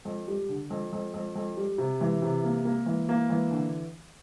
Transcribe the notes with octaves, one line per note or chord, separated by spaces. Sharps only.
F2
G3
D3
F2
F2
F2
F2
G3
C3
E3
C3
A#3
A#3
E3
A#3
E3
D3